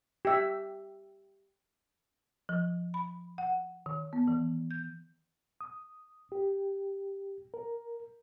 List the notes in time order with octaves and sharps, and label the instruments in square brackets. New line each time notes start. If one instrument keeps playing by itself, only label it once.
[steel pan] G4 E5
[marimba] F3
B5
F#5
D#3
B3
E3
G6
[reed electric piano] D#6
G4
A#4